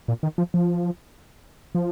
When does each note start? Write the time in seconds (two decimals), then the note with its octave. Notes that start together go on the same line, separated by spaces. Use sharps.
0.08 A#2
0.23 D#3
0.38 F3
0.54 F3
1.75 F3